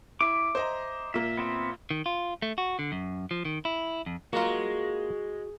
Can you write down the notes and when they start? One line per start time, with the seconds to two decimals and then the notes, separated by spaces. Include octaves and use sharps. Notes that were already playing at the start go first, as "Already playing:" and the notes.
0.21 E4 E5 D6
0.55 C5 D#5 A#5
1.14 A#2 A#3 E5
1.37 B3 C4 E5
1.91 D#3
2.06 F4
2.42 A3
2.58 F#4
2.79 D3
2.92 F#2
3.31 F3
3.45 D#3
3.65 E4
4.06 F2
4.33 G#3 A#3 F4 F#4 A#5